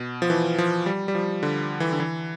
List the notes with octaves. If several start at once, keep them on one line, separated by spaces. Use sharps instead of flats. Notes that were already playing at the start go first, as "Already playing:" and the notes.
Already playing: B2
F3
E3
F3
G3
G3
F3
D3
E3
D3
E3